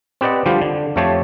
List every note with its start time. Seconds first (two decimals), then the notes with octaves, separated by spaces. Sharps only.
0.21 C4 G4 B4 D5 D#5 F#5
0.46 D3 F3 G3 F4 G4
0.62 D3
0.96 F2 F3 A3 G4 C#5 A5